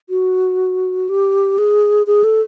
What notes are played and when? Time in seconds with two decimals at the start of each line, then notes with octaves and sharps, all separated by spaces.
0.10 F#4
1.09 G4
1.58 G#4
2.07 G#4
2.24 A4